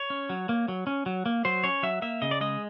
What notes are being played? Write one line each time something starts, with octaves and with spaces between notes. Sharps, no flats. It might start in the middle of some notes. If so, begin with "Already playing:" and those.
Already playing: C#5
C#4
F#3
A#3
F#3
C#4
F#3
A#3
F#3 C5
C#4 C#5
F#3 E5
A#3 E5
C#3 D#5
D5
G#3 D#5